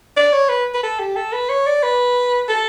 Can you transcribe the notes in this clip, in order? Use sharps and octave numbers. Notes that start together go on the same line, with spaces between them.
D5
C#5
B4
B4
A4
G4
A4
B4
C#5
D5
B4
A4